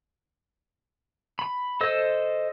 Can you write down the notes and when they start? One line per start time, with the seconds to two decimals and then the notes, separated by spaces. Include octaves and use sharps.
1.39 B5
1.81 A4 C5 D#5 E6